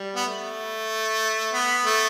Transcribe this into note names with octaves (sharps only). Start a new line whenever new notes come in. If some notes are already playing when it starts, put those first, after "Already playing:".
Already playing: G3
B3
A3
B3
A3